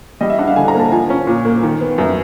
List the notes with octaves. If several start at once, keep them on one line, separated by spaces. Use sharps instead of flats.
G3 D#5
E5
D4 F#5
F5
D3 G#5
A#5
A#3 A5
F3 G#5
C#4
A#2
A#3
D#3
B3
F#2